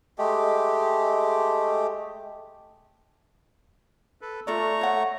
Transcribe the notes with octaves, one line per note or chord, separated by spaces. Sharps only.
G#3 A3 G4
A4 B4
A3 F4 A4 D5 A#5 C#6
C#5 F#5